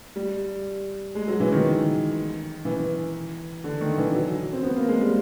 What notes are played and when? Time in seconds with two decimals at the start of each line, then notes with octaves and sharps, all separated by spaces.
0.16 G3
1.15 G#3
1.28 F#3
1.40 E3
1.52 D#3
2.65 E3
3.64 D3
3.81 D#3
3.98 E3
4.14 F#3
4.53 C4
4.63 B3
4.77 A#3
4.88 G#3
5.01 G3